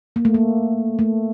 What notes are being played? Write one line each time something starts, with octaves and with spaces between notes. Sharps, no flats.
A#3
A3
A#3
A3